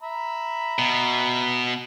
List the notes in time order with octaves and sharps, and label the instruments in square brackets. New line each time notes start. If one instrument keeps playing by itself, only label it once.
[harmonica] E5 A#5 B5
[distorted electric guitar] B2